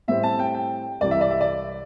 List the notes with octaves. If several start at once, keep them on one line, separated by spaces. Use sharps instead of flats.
A2 G3 C4 E5
A5
G5
G5
C2 C3 E3 D5
E5
D5
E5
D5